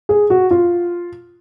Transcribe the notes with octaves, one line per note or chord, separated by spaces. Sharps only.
G#4
F#4
F4